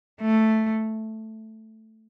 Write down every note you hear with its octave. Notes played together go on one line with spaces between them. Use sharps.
A3